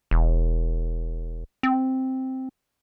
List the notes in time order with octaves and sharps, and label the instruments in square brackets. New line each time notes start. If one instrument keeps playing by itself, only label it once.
[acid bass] E1
C4